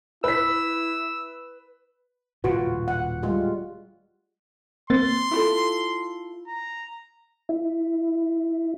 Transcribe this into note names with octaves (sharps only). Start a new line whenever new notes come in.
E4 B4 E6 B6
D#1 A2 C#3 F4 F#4 B4
F#5
G3 G#3 F4
A#3 C4 C6 A6
E4 F4 A4
A#5
E4